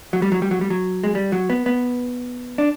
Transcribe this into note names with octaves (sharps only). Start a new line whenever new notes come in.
F#3
G3
F#3
G3
F#3
G3
F#3
G#3
G3
F#3
B3
B3
D4